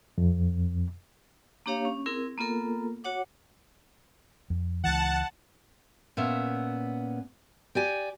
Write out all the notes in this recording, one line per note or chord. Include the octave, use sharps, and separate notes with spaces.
F2
A#3 D4 G4 C#5 F5
C#4
C4 E4 G#4 A#4
A#3 B3 F4 A4 A#4
F#4 C#5 F#5 D6
F2
C#2 E3 F#5 A5
A#2 B3 C#4 E5
G4 D5 G#5